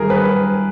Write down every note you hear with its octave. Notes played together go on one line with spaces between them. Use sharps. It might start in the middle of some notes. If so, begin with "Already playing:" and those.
Already playing: G2 D#3 G#4 A#4
B4